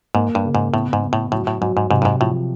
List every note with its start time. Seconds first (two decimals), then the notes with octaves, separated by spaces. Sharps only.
0.15 G#2 A#3
0.35 G2
0.45 C#3
0.55 G#2
0.73 A2 B3
0.93 G#2
1.03 B3
1.13 A2
1.32 A2 F#3
1.47 A2
1.61 G#2 F#3
1.77 G#2
1.91 G#2 C3
2.02 G2
2.05 G#2
2.20 A2 F3